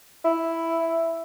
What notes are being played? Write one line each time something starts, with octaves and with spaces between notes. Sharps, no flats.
E4